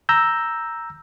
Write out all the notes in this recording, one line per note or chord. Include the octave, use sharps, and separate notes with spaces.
A#5 E6 G6